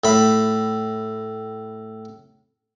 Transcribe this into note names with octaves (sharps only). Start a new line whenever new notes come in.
A2 B5